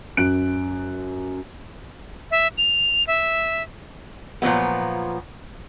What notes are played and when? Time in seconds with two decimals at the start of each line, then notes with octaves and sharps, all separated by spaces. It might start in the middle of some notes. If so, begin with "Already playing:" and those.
0.17 F#2 F#6 D7
2.31 E5
2.58 F7
3.07 E5
4.42 A#2 F3 F#3 A3 B3